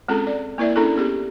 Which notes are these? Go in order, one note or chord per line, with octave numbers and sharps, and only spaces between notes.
G#3 C4 C#4 F4 G#4 A4
D5
A#3 E4 A#4 D5 E5
C#4 D4 E4 G#4 A4
B3 C#4 G4 G#4